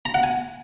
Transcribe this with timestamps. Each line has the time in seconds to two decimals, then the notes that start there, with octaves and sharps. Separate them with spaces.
0.05 A#5
0.14 F#5
0.23 G#5